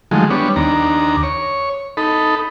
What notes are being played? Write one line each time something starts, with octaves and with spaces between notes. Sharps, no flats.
D#3 F3 F#3 G#3 A3
G3 B3 D4 C#5
D#2 D4 A#5
C#5
D#4 A4 B5